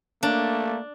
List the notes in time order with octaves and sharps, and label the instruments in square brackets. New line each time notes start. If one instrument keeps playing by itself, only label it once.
[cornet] A3 [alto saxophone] A#3 [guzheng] D4